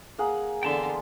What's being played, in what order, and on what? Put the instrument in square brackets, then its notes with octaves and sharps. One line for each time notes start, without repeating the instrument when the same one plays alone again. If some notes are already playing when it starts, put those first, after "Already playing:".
[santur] A#3 G#4 F#5
[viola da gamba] D3 E3 B3 [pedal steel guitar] G5 A5 C6